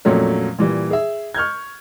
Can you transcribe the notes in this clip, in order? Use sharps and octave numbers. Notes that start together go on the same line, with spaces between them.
F2 A#2 F#3 A3 C#4
A#2 E3 G3
G#4 E5
C#6 F6 G6 G#6